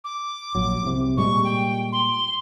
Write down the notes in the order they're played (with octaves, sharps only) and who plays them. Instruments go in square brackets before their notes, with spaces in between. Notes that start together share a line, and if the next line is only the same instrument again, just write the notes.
[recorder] D6
[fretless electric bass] A#1 F#3
C2 C3
[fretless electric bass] A#2 G3 G#3 [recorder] C#6
[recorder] G5
C6